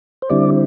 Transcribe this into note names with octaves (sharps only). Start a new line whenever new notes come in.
C5
D3 G3 C4 E4 D5